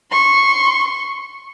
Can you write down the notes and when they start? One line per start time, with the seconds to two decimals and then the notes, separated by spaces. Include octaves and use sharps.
0.12 C6 C#6